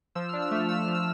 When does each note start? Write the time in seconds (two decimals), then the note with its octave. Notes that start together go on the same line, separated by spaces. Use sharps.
0.15 F3 E6
0.29 D4 F6
0.42 E6
0.51 A3 F6
0.69 A3 E6
0.81 F6
0.88 F3
0.95 E6